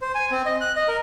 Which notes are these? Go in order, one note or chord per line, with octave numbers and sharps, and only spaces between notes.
C5
G#5
C4
D#5
F#6
D#5
A#4